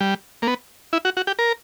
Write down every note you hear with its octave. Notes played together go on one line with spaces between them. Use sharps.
G3
A#3
B3
E4
F#4
F#4
G4
A#4